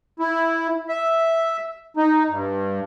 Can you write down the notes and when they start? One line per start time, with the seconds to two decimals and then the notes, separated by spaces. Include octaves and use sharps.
0.19 E4
0.89 E5
1.97 D#4
2.30 G2